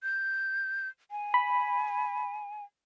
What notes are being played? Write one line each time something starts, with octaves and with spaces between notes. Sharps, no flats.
G6
G#5
B5